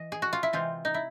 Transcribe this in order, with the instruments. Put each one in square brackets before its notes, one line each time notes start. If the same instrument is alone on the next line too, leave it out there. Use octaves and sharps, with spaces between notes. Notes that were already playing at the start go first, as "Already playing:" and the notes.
Already playing: [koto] E3 D#5
G#4
F#4
F4
E4
C3 E3 G#3 C4 F4
D#4
E4